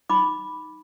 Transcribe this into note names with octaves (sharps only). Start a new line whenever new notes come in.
D#4 B5 D6